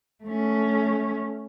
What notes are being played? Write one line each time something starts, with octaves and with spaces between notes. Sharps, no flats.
A3 C#4